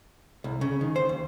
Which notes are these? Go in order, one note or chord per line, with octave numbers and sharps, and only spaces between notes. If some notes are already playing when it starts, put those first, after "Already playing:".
C2
C#3
D#3
C5
D#2